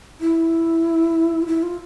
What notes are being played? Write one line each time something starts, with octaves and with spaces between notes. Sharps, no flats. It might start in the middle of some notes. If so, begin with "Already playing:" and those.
E4
F4
E4
F4